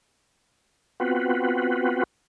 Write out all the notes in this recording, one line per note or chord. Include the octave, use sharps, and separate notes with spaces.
B3 C4 F4 F#4 B4